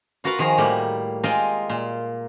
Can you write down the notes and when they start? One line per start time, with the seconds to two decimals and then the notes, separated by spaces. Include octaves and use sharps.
0.24 F4 F#4 A#4 B4 F5
0.39 D#3 F3 F#4 G#4 A#5
0.58 A2 G3 A#3 G4 F#5
1.24 G#3 F4 A#4 D#5 G5
1.70 A#2 C6